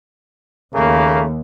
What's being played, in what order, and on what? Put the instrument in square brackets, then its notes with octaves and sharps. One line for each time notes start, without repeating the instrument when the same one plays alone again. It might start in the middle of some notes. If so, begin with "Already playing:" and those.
[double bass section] D#2 [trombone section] C#3 A3 A#3